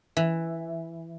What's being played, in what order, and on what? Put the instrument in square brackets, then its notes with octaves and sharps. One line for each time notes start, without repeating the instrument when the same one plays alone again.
[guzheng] E3